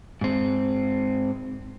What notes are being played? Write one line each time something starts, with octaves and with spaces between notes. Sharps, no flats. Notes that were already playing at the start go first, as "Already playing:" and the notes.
G#2 C4